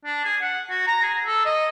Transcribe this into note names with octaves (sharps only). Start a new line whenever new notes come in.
D4
G#4
F#5
F#4
A#5
G#4
A4
D#5